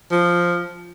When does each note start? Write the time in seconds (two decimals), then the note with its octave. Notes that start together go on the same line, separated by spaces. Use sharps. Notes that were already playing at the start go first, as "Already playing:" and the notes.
0.11 F3